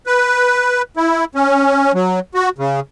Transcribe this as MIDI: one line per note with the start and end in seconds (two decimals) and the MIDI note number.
0.07 0.82 71
0.97 1.25 64
1.35 1.92 61
1.95 2.20 54
2.34 2.49 66
2.58 2.80 49